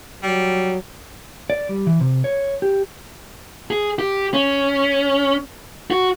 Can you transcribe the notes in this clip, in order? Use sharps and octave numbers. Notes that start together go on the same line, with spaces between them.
F#3 G3
D5
G3
E3
C3
C#5
G4
G#4
G4
C#4
F#4